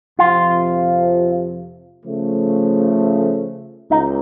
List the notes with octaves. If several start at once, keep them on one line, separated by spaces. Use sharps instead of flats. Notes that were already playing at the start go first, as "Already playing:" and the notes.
F2 C3 F3 F4
C#3 F3 A3
C#2 D#4